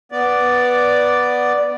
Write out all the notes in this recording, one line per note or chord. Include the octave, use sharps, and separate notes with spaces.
B3 D5